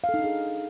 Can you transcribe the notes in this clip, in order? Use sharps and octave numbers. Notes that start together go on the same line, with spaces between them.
F5
A4
D#4
D4
G#4